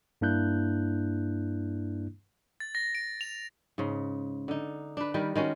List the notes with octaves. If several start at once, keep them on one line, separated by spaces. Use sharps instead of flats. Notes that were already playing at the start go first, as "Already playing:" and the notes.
G2 A#3 D4 E4 F#6 G6
A6
A#6
D7
F7
G#2 C#3
D3 D#4
D4 B4
D#3 G3 A#4 B4
D#3 G#3 C#4 F#4